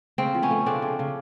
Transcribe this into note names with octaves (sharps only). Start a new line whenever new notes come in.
C#3 C4
F3
B3 C#4
A3
C#3 C4 D4
C#3
C#3